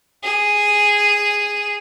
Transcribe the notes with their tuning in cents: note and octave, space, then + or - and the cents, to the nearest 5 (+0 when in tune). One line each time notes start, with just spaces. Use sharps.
G#4 -5